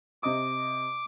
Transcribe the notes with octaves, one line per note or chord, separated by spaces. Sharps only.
C3 D#5 D6 D#6